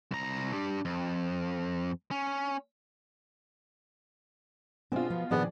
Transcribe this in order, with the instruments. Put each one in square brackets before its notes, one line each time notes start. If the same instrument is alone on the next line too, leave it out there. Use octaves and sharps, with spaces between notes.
[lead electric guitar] C2 A#5
D4 G4
F2
C#4
[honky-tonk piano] B2 F4 [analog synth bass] C4 [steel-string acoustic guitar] D4 G#4 C5
[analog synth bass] F3 [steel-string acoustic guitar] B3
[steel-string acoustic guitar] A#2 D#3 [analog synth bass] F3 [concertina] B3 [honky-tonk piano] D4 G#4 D5